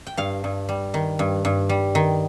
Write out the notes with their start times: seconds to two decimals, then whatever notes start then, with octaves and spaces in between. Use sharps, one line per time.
0.07 G5
0.17 G2 F5
0.44 G2
0.69 G3
0.94 D#3
1.19 G2
1.45 G2
1.69 G3
1.95 D#3